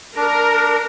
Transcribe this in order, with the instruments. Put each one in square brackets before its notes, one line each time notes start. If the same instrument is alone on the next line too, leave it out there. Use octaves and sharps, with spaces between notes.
[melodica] D4 [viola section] A#4